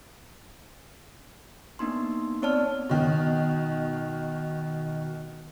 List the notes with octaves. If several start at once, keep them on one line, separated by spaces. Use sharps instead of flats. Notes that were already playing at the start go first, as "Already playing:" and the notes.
A#3 B3 D4 D#4 C6
B3 C4 C#5 D5 A5 F6
B2 D#3